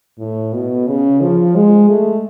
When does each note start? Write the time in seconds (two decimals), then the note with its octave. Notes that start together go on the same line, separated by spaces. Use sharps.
0.19 A2
0.53 B2
0.87 C#3
1.21 F3
1.55 G#3
1.89 A3